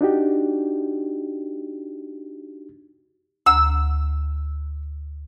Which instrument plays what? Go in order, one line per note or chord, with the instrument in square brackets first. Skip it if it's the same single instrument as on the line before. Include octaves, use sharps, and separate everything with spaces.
[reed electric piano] D4 D#4 F#4 G4
[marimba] D2 A#5 [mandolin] E6